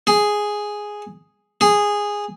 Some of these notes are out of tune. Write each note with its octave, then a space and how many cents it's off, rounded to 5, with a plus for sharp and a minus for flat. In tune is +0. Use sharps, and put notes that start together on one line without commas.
G#4 +0
G#4 -10